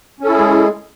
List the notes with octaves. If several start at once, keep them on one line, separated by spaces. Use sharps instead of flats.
G#3 C#4 E4 G#4 A4